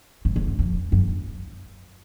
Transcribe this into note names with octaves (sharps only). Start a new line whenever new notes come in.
G#2
G#2
F#2
F2
F#2